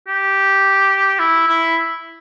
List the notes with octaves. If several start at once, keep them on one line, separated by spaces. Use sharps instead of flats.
G4
E4
E4